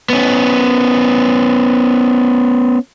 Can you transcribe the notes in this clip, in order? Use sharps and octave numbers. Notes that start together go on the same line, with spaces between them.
B3 C#4